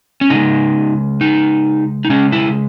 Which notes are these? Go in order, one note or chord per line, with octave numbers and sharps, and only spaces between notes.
C#4
C#3 G#3 D#4
D#4
D#4
C#3 G#3 C#4
E4